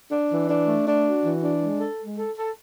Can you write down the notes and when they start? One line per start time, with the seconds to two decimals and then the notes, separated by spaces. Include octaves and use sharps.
0.11 D4
0.30 E3
0.49 D4
0.67 A3
0.87 D4
1.05 F#4
1.24 E3
1.43 D4
1.61 G#3
1.80 A4
1.99 G#3
2.17 A4
2.37 A4